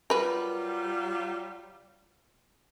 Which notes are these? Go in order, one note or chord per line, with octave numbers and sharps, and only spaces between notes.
F#3 G3 F4 A#4 B4